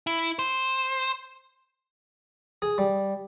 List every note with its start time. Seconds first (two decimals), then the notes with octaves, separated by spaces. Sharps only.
0.07 E4
0.39 C5
2.62 G#4
2.78 G3